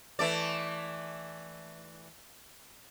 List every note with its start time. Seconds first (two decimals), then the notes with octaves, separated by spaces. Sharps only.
0.19 E3 A3 D5